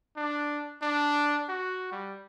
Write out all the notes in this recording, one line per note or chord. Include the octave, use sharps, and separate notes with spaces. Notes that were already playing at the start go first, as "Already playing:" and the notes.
D4
D4
F#4
G3